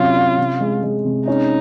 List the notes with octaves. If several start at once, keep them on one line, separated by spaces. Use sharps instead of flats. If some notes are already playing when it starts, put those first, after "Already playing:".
Already playing: C3 F#3 C#4 F4
C#4
C3
G#3
G#3
C3
C#4 D#4